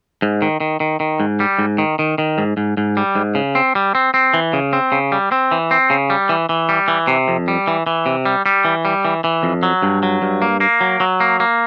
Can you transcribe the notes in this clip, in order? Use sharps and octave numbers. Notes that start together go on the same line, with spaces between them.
G#2
D#3
D#3
D#3
D#3
G#2
G3
G#2
D#3
D#3
D#3
G#2
G#2
G#2
G3
G#2
C#3
C4
G3
C4
C4
E3
C#3
C4
C#3
G3
C4
E3
C4
C#3
G3
E3
E3
G3
E3
C3
F2
G3
E3
E3
C3
G3
G3
E3
G3
E3
E3
F2
F#3
G2
F#3
G2
A#3
A#3
F#3
F#3
A#3
A#3